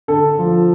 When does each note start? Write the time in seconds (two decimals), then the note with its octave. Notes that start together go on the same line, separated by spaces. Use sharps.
0.08 D3 A4
0.39 F3